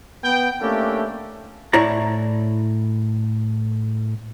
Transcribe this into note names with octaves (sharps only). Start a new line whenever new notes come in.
B3 G5
A3 A#3 C#4 D4 E4 G4
A2 E4 C#5 D5 A#5